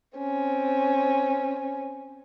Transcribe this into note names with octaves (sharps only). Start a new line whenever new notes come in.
C4 C#4